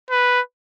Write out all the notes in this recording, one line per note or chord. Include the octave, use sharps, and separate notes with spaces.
B4